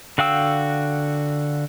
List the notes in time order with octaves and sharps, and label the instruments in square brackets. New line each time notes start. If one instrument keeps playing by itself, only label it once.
[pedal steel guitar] D3 F#4 F5 G5 E6